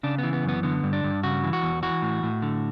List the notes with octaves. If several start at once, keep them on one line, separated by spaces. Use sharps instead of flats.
C#3 D4
B3
E3
B3
F#2 B3
D3 B3
G2
D4
G2
C#3 F#4
E3
F#4
E2
E3 F#4
A2
A2
D3